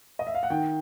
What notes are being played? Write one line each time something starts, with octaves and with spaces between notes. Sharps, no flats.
D#5
E5
F5
F#5
D#3 G5